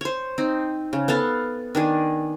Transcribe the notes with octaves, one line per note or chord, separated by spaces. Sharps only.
C5 C#5
C4 D#4
C#3
B3 A4 F5 A5
D#3 D4 G#4